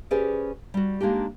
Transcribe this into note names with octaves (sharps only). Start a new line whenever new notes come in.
C#4 G4 G#4 B4 C5 D5
G3 F#4
G#3 A#3 D4 D#4 G4